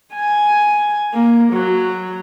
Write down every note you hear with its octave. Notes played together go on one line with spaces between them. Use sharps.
G#5
A#3
F#3